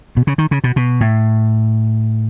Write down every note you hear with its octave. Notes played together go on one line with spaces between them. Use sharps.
B2
C#3
D#3
C#3
B2
B2
A2